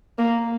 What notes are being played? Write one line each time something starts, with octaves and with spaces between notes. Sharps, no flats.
A#3